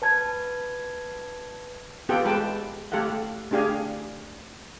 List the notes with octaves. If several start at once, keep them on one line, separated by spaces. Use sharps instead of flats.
B4 A5 G#6
B3 F4 G4 A4 F#5 G5
G#3 G4 B4 G5 A5
A3 G4 A4 F5 F#5
A3 D4 G4 G#4 F5 G#5